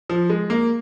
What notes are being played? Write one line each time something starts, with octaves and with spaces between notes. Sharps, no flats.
F3
G#3
A#3